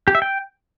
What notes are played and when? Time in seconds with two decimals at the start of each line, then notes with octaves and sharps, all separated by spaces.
0.08 G4
0.15 E5
0.22 G5